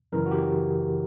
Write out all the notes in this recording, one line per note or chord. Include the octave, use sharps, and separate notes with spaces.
F#2 C#3 E3 A#4
F#4
G4